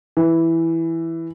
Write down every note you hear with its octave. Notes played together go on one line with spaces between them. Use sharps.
E3